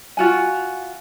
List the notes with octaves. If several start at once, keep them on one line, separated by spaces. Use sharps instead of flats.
F4 F#4 G#5